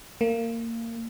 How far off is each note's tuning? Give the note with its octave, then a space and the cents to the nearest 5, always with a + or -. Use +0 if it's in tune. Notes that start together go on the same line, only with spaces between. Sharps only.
A#3 -25